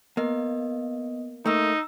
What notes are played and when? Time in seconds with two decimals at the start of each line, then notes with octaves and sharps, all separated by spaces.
0.17 A#3 B3 D#5
1.46 A3 A#3 D#4 A#5 E6